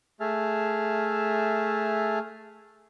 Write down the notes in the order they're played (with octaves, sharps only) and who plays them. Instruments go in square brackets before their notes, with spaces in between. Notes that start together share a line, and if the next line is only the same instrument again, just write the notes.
[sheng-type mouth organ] A3 G#4 E5 A5 F6